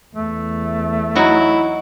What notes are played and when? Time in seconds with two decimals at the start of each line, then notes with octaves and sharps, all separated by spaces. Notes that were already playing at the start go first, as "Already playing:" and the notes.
0.15 E2 A3
1.15 F#3 D#4 E4 F#4